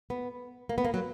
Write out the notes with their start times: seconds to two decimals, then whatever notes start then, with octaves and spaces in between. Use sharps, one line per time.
0.10 B3
0.69 A#3
0.78 B3
0.85 A#3
0.94 F#3